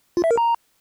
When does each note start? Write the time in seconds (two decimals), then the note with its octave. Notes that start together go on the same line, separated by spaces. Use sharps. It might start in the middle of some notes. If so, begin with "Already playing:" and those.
0.17 F4
0.24 E5
0.31 A#4
0.37 A#5